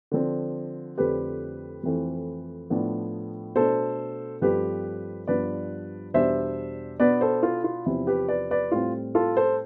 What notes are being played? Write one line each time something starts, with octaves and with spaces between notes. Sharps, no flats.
D3 F3 C4
F2 D3 A3 C4 G4 B4
F2 E3 A3 C4
A2 F3 B3 D4
B2 A3 D4 A4 C5
G2 F3 A3 C4 G4 B4
G2 F3 B3 D4 B4 D5
E2 B2 G3 D4 C5 E5
B2 B3 D4 B4 D5
A4 C5
F4 A4
F4
E2 C3 F3 C4 E4
G4 B4
B4 D5
B4 D5
A2 G3 C4 F4
F4 A4
A4 C5